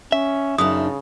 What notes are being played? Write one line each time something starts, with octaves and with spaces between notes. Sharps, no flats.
C#4 E5
F#2 C#3 D4 D#4 D#6